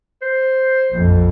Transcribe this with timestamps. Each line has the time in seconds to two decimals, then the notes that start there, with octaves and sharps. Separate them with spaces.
0.22 C5
0.91 A#1 F2